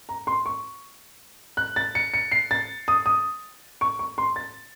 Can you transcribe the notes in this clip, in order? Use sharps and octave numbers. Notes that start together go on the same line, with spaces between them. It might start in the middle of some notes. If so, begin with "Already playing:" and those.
A#5
C6
C#6
F#6
A6
C#7
C#7
C7
A6
D#6
D#6
C#6
C#6
C6
A6